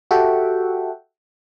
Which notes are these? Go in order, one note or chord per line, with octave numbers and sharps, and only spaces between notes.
F#4 G4 A4 E5 F#5 G5